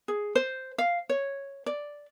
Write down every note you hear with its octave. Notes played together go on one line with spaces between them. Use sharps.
G#4
C5
F5
C#5
D5